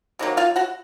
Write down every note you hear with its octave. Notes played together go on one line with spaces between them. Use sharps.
C3 D#3 F#3 A#3
F4 F5
F#4 F#5